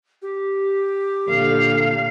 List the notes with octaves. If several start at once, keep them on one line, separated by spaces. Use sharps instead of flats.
G4
A#2 D3 A4 F5